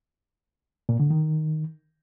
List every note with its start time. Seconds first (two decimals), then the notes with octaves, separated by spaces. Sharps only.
0.89 A#2
1.00 D3
1.10 D#3